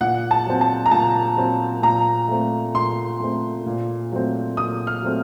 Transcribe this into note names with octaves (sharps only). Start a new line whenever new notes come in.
A#2 F#5
A5
F#3 C4
A5
A#5
A#2 A5
F#3 C4
A#2 A#5
A3 C4
A#2 C6
A3 C4
A#2
F#3 A3 C4
A#2 D#6
F6
F#3 A3 C4